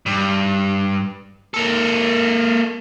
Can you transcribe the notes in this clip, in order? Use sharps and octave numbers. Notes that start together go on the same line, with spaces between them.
G2
A#3 A4